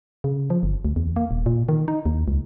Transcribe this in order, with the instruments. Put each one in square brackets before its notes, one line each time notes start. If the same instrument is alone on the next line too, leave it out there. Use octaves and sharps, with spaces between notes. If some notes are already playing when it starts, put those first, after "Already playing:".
[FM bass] C#3
F3
G1
D2
E2
A#3
D#1
A#2
D#3
D#4
D#2
C#2